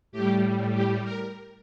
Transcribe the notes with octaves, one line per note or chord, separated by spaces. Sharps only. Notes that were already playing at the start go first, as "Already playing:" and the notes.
A2 G4
G3
G4
A#4